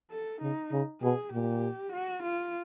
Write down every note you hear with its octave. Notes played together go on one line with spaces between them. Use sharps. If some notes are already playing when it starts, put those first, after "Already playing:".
A4
C#3 D#4
C#3
B2 G#4
A#2 G4
F#4
F4